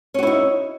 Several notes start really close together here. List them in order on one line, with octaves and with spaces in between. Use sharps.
C#4 F#4 E4 D#4